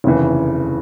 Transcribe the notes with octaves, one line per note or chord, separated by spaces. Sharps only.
F1 D#2 C#3 E3